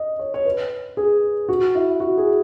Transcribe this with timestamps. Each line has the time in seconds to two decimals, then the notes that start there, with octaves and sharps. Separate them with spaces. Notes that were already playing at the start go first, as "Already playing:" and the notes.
Already playing: D#5
0.19 C#5
0.34 C#5
0.45 B4
0.97 G#4
1.49 F#4
1.75 E4
2.00 F#4
2.18 G#4